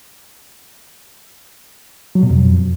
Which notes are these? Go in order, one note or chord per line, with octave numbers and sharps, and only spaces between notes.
F#3
B2
F2